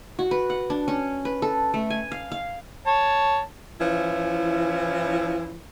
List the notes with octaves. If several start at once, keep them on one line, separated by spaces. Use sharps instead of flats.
F#4
B4
F#5
D4
C#4
B4
A4
A3
G#5
F5
F5
C#5 A5
E3 F3 C#4 E4